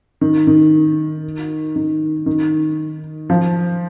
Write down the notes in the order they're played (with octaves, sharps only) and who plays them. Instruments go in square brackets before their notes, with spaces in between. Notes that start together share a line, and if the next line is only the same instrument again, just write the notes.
[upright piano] D#3
D#3
D#3
D#3
F3